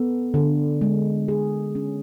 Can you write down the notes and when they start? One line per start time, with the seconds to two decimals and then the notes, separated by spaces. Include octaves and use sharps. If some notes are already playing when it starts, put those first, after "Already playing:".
Already playing: B3 A4
0.34 D3
0.81 G#3
1.28 G#4
1.75 C#4